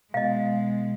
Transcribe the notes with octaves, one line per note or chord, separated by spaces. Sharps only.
B2 G#3 D#5 F5